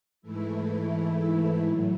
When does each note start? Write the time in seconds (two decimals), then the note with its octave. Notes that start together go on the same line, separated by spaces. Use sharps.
0.22 G#2 E3 A3 E4
1.64 A2 F#3